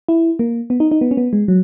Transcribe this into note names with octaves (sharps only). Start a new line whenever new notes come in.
E4
A#3
B3
D#4
D#4
B3
C#4
B3
G#3
F#3